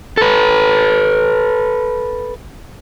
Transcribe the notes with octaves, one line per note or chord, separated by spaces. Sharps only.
A4 B4